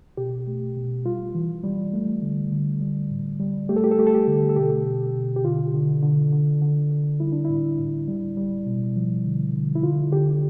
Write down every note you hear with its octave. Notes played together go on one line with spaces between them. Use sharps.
B2 G4
A3
B2
G3 F4
E3
G3
A3
D3
D3
G3
A2
G3
A3 G4
A4
G4
A4
A3 G4
A4
G4
D3
A4
B2 G4
B2
B2
G4
D3 F4
D3
D3
D3
D3
D3
G3 E4
D4
A2 E4
A2
G3
G3
B2
F3
D3
D3
E4
D3 F4
D3 G4